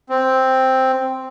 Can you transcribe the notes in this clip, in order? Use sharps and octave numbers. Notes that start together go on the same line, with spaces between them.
C4